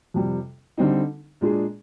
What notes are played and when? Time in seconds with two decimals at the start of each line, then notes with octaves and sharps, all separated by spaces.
0.14 F2 C3 G3
0.78 D3 G3 C4 D#4
1.41 A#2 G#3 D4 G#4